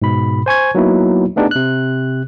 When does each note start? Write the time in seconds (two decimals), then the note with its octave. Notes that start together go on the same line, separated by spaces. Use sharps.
0.02 G#2 B2 B5
0.46 C5 G#5 C#6 G#6
0.75 F#3 A#3 B3 D#4 E4 F#4
1.36 A3 B3 D4 D#4 G4 G#4
1.51 C3 F#6